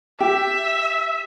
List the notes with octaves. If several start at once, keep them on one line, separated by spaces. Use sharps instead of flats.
G4 E5